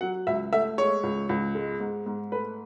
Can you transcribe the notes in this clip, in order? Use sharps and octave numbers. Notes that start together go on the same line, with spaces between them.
F#3 F#5
C#2 E5
A3 E5
G#3 C#5
C#2
C#2
G#3
G#2
G#2
A3 B4